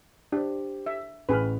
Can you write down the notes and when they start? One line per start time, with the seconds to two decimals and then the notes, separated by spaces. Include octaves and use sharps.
0.32 D4 G4 C5
0.86 E5
1.29 A1 G#4 B4 F6